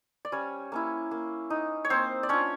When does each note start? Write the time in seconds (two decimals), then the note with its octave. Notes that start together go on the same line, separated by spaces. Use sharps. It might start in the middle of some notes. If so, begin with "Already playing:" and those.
0.25 D5
0.32 G3 C#4 C#5
0.72 A#3 C#4 E4
1.11 A#3
1.50 D#4
1.85 C#5
1.90 A#3 C4 C5
2.23 D5
2.29 C#4 D4 F4 C#5